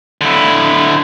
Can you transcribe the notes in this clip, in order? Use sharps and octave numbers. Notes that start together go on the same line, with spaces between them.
D3 E4